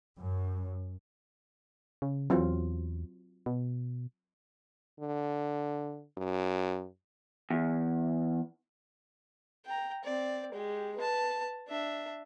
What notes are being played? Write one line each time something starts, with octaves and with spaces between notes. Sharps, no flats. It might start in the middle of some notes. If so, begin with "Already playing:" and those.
F#2
C#3
E2 F#3 C4 F4
B2
D3
F#2
E2
G5 A#5
C4 D5
G#3 G4
B4 A5
D4 E5